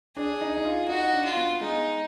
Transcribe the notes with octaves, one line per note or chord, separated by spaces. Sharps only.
D4 G#4
D#4
D#4
F4
D#4 F#4
D4
F4
B3
G#3 D#4